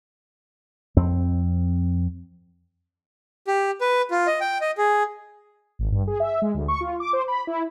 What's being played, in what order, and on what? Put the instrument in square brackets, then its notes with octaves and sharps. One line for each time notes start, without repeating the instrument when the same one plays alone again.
[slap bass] F2 C4
[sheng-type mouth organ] G4
B4
F4
D#5
G5
D#5
G#4
[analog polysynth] G#1
G2
G#4
E5
G#3
D2
C#6
F4
D6
C5
B5
E4